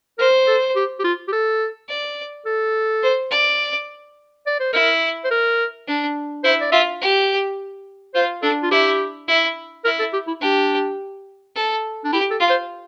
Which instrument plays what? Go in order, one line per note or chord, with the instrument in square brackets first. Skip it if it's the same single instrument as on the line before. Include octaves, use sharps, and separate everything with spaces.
[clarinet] A#4 [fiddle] C5
[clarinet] A4
G4
G4
F4
G4
A4
[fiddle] D5
[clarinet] A4
[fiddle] C5
D5
[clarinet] D5
C5
[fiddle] E4 [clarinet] A#4
[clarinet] C5
A#4
[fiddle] D4
[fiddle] E4 [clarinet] C5
[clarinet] D5
[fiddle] F4 [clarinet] E5
[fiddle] G4
[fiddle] F4 [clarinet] C5
[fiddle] D4 [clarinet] A4
[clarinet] F4
[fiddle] E4 [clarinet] G4
[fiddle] E4
[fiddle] E4 [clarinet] A#4
[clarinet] A4
G4
E4
[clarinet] D4 [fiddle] G4
[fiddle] A4
[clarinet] D4
[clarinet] E4 [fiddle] G4
[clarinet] A4
[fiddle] F4
[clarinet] C5